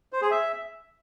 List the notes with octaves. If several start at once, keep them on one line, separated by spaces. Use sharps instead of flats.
C5
G#4
E5